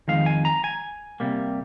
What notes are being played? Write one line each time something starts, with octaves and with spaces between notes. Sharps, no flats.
F2 D#3 G#3 F5
G#5
A#5
G#5
C3 G3 A#3